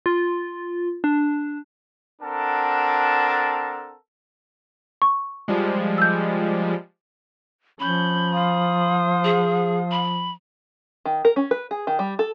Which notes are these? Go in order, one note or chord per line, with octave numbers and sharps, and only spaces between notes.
F4
D4
C4 D4 A4 A#4 F#5 A5
C#6
F3 G3 G#3
E6 G6
F3 C#4 B5 G6
C5 F5 D#6
G#4
B5
D#3
A#4
C#4
B4
G#4
D#3
G3
A4